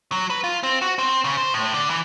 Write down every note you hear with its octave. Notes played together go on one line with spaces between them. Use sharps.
F#3
B4
F4
C4
F#4
C4
C#3
C5
A2
D3
E3